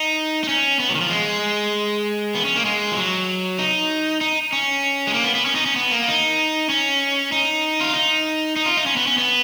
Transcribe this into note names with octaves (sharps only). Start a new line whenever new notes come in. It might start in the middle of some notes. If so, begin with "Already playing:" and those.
Already playing: D#4
D#4
C#4
B3
F#3
D#3
F3
G#3
B3
C#4
A#3
G#3
F3
F#3
D#4
D#4
C#4
G#3
A#3
B3
B3
C#4
D#4
C#4
B3
A#3
D#4
C#4
D#4
F4
D#4
D#4
F4
D#4
C#4
B3
C#4
B3